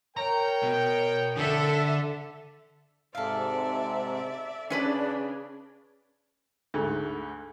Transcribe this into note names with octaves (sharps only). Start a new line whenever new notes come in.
A#4 C#5 G5 A#5
B2
D3 A4 E5
G#2 C3 A4 D5 E5 F5
C#3 C#4 D4 G#4 B4 D5
D2 G#2 A3